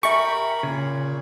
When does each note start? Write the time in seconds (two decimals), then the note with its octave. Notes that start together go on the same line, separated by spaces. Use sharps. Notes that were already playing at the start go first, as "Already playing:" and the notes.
0.03 G4 A#4 E5 G#5 B5 C#6
0.63 A#2 C#3 G#4